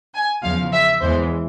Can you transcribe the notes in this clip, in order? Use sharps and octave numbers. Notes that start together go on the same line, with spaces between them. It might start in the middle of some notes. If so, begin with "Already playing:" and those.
G#5
E2 C#3 F3 F5
E5
E2 E3 G#3 C5